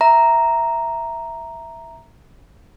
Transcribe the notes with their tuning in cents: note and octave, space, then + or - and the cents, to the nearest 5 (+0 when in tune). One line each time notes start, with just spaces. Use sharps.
E5 +0 A#5 +0